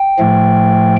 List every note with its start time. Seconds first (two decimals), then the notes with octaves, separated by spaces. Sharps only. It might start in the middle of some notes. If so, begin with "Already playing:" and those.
Already playing: G5
0.19 A2 F3 A3